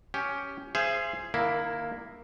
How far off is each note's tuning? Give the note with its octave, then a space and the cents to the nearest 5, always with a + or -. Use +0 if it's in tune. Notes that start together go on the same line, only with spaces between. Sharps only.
C#4 +10 G4 +5
G#4 +0 C5 +0 E5 +45
D#3 -30 A#3 +0 E4 +5